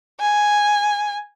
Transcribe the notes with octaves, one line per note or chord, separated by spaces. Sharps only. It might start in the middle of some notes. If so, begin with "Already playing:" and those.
G#5